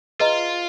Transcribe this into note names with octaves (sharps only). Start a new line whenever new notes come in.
F4 G#4 B4 D#5 A#5